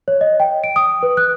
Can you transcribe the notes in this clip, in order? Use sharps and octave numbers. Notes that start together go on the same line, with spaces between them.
C#5
D#5
G5
D7
D#6
B4
F#6